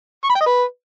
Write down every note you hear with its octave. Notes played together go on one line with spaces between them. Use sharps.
C#6
B5
G5
D#5
B4